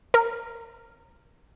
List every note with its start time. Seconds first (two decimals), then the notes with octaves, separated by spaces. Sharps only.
0.14 A#4